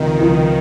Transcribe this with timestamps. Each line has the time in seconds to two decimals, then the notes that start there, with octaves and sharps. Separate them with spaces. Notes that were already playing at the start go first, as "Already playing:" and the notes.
Already playing: C#2 C3 D#3 F3
0.18 C#2 C3 F3